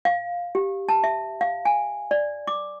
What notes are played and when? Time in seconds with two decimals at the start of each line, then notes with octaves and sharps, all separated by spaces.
0.05 F5
0.55 G4
0.89 A5
1.04 E5
1.41 F5
1.65 G#5
2.11 D5
2.47 D6